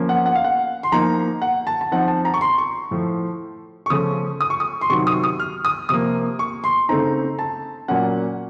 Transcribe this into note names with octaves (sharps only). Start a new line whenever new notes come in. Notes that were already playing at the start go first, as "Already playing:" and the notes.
Already playing: F3 A#3 C#4
F#5
F#5
F5
F#5
C6
F3 A#3 D#4 A#5
F#5
A5
A5
F3 C4 D#4 F#5
A5
A#5
C#6
C6
C#6
A2 F3 A3
C#6
C#3 F3 A3 C#4 D#6
D#6
C#6
D#6
C6
C3 D#3 F#3 C#6
D#6
D#6
F6
D#6
C3 F3 A#3 D#6
C#6
C6
C#3 A3 C4 D#4 A#5
A5
A#2 F#3 A#3 C#4 F#5